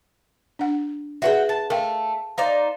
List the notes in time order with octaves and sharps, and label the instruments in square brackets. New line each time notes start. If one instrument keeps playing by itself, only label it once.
[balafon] D4 F#5
[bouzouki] F#4 F#5 G5 [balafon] G#4 B4 E5
[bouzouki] A5
[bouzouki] A3 [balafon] A#4 F5 G5
[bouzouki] D#4 C5 D5 [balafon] F5